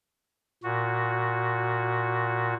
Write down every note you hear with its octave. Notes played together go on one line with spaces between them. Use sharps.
A#2 F#4